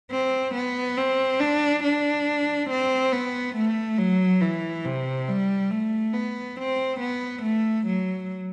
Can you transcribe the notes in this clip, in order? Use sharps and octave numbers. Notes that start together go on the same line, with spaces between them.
C4
B3
C4
D4
D4
C4
B3
A3
F#3
E3
C3
G3
A3
B3
C4
B3
A3
F#3